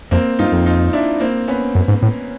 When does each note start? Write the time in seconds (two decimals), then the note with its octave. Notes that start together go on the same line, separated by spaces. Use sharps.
0.11 F2 A#3 C4
0.39 G2 D#4 F4
0.52 F2
0.66 D#4 F4
0.93 D4 E4
1.20 A#3 C4
1.48 B3 C#4
1.75 F#2
1.88 G#2
2.02 A2